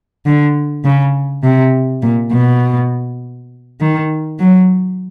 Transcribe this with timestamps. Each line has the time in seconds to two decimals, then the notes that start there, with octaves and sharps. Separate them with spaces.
0.26 D3
0.85 C#3
1.43 C3
2.02 A#2
2.32 B2
3.80 D#3
4.39 F#3